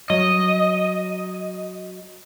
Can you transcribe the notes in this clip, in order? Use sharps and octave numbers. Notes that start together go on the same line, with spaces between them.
F#3 D#5